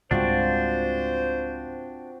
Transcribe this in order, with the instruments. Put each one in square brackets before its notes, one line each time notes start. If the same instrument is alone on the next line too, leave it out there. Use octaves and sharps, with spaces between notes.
[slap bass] C#2 G#2 G3 [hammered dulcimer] C4 F4 F#4 [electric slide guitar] D4 [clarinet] C5